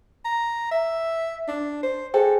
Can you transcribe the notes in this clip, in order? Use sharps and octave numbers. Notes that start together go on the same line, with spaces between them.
A#5
E5
D4
C5
G#4 A4 C5 G5